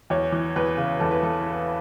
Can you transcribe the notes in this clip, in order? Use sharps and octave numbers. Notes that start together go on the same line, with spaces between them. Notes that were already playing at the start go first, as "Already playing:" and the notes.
E2 C#5
E3
E2 B4
C#3
E2 A4
B4
E3 A4